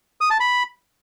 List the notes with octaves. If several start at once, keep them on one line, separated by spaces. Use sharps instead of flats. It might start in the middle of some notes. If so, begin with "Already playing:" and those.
D#6
A5
B5